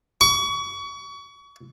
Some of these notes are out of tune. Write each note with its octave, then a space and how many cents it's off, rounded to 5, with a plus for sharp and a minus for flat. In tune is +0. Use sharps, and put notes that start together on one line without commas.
C#6 +30